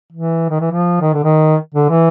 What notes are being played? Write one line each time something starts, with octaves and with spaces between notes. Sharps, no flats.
E3
D#3
E3
F3
D#3
D3
D#3
D3
E3